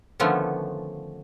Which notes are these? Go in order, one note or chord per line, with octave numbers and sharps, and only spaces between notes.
D3 D#3 F3 A3 B3 C#4